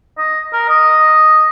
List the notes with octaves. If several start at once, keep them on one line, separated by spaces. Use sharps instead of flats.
D#5
A#4
D#5